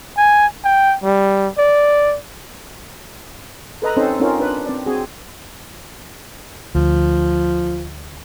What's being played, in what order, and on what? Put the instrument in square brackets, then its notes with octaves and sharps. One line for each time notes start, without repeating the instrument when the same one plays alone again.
[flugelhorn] G#5
G5
G3
D5
[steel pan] A4 B4 D#5 A#5
C4 C#4 D#4 A4 C5 D#5
C4 C#4 D#4 F4 A#4
D4 B4
C4 C5 D5
C4 F#4 G#4
[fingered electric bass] D2 [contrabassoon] F3